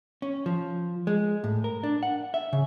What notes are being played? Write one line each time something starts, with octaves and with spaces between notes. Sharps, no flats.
C#4
F3
G#3
A2
A#4
D4
F#5
E5
C#3